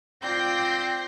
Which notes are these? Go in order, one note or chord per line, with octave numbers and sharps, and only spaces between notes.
C4 F4 D5 G5 G6 A#6 C7